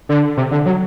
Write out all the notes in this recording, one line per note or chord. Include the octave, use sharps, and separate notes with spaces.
D3
C3
D3
F#3